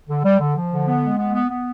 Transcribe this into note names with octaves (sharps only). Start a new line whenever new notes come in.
D3
G3
D3
F3
D3
B3
G#3
B3
B3
B3